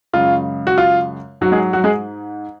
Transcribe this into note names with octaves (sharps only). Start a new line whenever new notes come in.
F#2 C#3 G#3 F4
F#4
F4
G#2 F#3 F#4
G#3 G#4
F#3 F#4
G#3 G#4